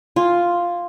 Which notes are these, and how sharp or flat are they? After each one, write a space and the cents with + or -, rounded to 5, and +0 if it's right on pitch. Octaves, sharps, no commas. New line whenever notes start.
F4 +0 G#5 -15